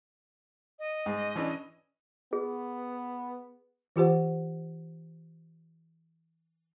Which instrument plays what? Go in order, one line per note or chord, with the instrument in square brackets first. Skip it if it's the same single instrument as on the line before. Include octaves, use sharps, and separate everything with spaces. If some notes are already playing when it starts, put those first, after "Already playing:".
[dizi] D#5
[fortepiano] G#2
E3 C#4 D4
[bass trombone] B3 [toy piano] G#4
[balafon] E3 F4 G4 C5 F#5